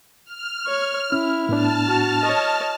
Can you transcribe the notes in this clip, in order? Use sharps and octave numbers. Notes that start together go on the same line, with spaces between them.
F6
C#5
C#4 E4 F6
A2 B3 D4 A5 F6
F#4
C#5 D#5